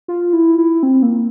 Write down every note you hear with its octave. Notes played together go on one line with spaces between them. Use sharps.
F4
E4
E4
C4
A#3